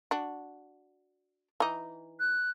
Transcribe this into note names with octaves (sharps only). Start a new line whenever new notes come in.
D4 F#4
E3 D#4
F#6